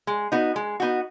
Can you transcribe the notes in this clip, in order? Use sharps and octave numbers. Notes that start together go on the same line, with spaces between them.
G#3
B3 D#4 F#4
G#3
B3 D#4 F#4